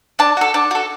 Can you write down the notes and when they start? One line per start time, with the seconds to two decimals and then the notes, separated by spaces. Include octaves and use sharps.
0.19 D4 A5
0.37 F#4 A4
0.54 D4 A5
0.71 F#4 A4